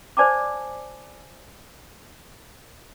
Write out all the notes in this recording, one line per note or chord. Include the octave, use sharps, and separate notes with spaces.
C5 D5 G#5 A5 D6